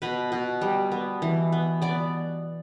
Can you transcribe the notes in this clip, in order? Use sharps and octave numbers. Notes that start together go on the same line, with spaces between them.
B2 B4
B2
G3
B3
E3
B3
B3 D5